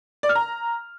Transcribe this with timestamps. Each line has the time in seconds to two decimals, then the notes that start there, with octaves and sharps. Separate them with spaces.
0.23 D5
0.29 F6
0.35 A#5